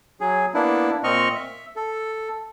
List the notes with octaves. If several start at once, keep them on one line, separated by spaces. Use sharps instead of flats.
F#3 G#4
A#3 B3 D4 E4
A#2 C4 D#5 C#6 F6
E5
A4